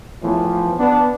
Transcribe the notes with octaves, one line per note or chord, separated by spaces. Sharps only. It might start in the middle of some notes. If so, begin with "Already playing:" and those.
E2 A2 E3 F3
B3 D4